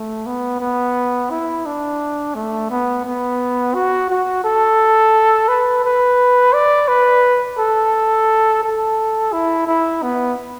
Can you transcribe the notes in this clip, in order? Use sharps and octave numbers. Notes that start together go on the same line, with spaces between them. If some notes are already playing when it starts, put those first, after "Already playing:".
Already playing: A3
B3
B3
E4
D4
A3
B3
B3
F#4
F#4
A4
B4
B4
D5
B4
A4
A4
E4
E4
B3